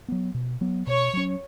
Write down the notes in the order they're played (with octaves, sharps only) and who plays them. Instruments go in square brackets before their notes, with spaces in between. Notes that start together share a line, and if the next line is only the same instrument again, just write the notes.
[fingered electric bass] F#3 B3
B2
F#3 B3
[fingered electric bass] B2 [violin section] C#5
[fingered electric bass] F#3 C#4